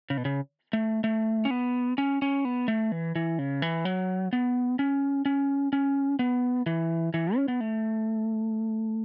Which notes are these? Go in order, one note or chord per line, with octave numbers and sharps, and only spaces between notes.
C#3
B2
C#3
A3
A3
C#4
B3
C#4
C#4
B3
A3
E3
E3
C#3
E3
F#3
B3
C#4
C#4
C#4
B3
E3
E3
C#4
B3
A3